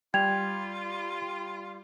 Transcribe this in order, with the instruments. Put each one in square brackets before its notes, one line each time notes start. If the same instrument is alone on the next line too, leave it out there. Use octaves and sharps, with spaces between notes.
[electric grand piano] G3 [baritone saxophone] F4 [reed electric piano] G5 [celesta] G#6 F7